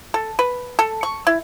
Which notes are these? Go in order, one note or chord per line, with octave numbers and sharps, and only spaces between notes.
A4
B4
A4
C#6
E4